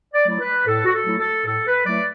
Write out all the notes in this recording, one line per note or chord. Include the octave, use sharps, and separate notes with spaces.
D5
F#3 A3 E4 D5
B4
A2 A4
F#4
A4
F#3 A3 E4
A4
A2 A4
B4
F#3 A3 E4 D5